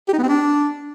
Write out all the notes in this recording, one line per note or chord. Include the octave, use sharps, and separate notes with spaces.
G4
D#4
B3
C4
D4